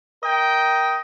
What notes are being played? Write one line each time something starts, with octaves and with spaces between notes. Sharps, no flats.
A#4 D#5 G5